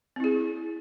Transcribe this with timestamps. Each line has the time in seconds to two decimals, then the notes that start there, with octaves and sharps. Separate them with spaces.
0.16 C4
0.20 E4
0.24 G#4